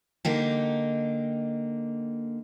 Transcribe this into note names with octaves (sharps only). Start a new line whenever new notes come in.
D3 A#3 D#4 G4